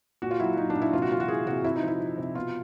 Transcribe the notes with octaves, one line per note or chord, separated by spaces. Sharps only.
A#2 F#4
F4
F#3 E4
F#3 D#4
D4
A#2
E4
C3 F4
F#4
E3 F4
F#4
E3 G#4
C3 F#4
C3 E4
D#4
F3 E4
F3
C3
B2 F4